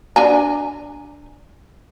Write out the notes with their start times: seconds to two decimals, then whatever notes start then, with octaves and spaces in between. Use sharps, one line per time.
0.16 D4 G#5 A#5